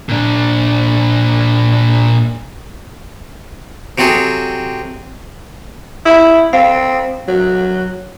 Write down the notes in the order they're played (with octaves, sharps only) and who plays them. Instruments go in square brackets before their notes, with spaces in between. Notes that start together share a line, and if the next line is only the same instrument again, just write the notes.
[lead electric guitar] A#2 D4
[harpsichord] C3 F#3 C4 G#4 A4
[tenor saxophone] E4
[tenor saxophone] C4 [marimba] F5
[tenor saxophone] F#3